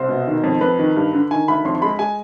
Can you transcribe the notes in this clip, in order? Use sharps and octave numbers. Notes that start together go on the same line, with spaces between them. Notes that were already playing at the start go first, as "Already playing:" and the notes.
Already playing: C2 C5
B2
D#3
F2
F2 B4
D#3
G2
D3
D#3 G#5
D2 B5
F2 C6
C6
G#3 B5
G#3 G#5